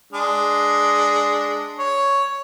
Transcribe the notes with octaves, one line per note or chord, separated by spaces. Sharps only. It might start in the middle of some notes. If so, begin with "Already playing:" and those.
G#3 D4
C#5